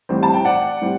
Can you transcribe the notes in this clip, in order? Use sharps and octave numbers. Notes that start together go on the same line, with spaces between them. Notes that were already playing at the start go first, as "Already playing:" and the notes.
A1 A2 G3 C4
A5
G5
D5 F#5
A2 G3 C4